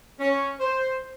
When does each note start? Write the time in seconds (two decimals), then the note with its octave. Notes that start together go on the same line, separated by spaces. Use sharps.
0.20 C#4
0.60 C5